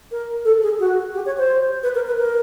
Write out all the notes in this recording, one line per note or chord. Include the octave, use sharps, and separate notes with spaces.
A#4
A4
G#4
F#4
G4
C#5
C5
B4
A#4
B4
A#4